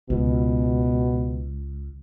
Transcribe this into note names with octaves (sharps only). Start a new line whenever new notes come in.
C#2 B2